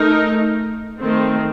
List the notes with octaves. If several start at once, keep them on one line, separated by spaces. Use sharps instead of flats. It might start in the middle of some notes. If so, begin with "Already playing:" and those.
Already playing: A3 D#4 A#4
D#3 A3 C4